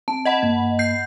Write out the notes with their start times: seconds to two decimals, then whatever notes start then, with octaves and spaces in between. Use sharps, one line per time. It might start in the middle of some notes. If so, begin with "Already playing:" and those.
0.08 C4 A5
0.25 D#5 F#5 B5
0.42 G2 A#3 G#6
0.79 G6 C7